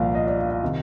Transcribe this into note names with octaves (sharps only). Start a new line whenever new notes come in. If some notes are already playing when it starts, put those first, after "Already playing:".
Already playing: C2 A#2 F3 F5
D#5
D5
F5
F5
C3 D#3